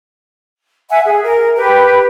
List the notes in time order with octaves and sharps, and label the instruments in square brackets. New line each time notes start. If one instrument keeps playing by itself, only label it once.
[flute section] E5 F#5 G#5
G#4
A#4
G4 B4